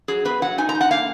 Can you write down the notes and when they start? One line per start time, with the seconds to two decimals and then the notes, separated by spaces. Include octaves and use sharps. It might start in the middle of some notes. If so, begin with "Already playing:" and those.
0.08 F#3 G#4
0.25 B3 B4
0.42 F#3 F#5
0.58 D#4 G#5
0.69 A#5
0.75 D#4
0.81 F#5
0.91 A#3 F5